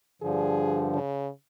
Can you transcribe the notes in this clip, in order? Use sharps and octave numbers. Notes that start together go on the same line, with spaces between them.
G2 D3 F3 G#4
C#3